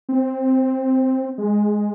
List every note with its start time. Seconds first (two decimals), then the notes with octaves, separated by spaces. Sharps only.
0.09 C4
1.38 G#3